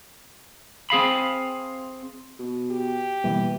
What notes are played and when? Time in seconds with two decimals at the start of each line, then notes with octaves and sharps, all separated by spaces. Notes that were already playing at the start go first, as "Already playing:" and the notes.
0.90 C4 G#4 F5 B5
2.39 B2
2.71 G4
3.24 B2 E3 G3 A#3